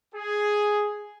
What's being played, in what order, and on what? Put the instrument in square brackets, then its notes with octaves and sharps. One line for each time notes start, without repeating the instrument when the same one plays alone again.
[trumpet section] G#4